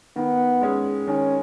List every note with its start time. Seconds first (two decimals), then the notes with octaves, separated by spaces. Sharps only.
0.16 D#3 B3
0.61 G#3 C#4 G#4
1.07 D#3 C#4